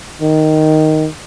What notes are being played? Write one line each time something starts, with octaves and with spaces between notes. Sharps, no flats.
D#3